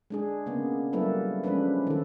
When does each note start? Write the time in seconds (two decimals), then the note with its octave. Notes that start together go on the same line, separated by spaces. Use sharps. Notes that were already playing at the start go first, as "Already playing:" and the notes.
0.10 G#3 D4 G#4
0.46 C#3 A#3 B3
0.93 F#3 G3 A#3 E4 A4 B4
1.44 F3 G#3 C#4 D4 B4
1.87 D#3 A4